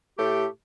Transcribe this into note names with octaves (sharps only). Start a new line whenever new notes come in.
A2 A3 G4